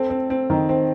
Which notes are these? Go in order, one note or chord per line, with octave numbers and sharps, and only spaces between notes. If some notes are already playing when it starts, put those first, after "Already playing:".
Already playing: C4 A4
C4
C4
D#3
C4